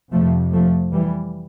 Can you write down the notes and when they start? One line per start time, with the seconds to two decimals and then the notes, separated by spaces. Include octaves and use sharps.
0.13 F2 C3 F3 A3
0.53 F3 A3
0.93 E3 G3